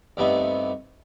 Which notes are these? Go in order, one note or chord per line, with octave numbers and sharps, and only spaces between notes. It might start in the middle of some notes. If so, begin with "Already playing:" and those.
G2 C3 A3 B3 D#4